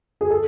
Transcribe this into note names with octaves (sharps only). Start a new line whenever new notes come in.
G#4
A4